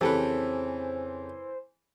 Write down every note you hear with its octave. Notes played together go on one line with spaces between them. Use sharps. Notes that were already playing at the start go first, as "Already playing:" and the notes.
F2 C#3 E3 G4 A4 B4 C5